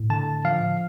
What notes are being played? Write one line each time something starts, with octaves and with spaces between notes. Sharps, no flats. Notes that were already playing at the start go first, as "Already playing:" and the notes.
Already playing: A2
D3 A5
F3 F5